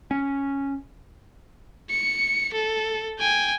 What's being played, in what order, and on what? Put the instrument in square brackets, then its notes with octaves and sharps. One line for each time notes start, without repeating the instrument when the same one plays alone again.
[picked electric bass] C#4
[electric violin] C#7
A4
G5 G#5